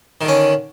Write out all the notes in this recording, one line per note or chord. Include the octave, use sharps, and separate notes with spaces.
D3 D#3 C#4